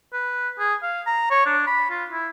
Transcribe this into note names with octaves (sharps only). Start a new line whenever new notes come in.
B4
G#4
F5
A#5
C#5
D4
B5
F4
E4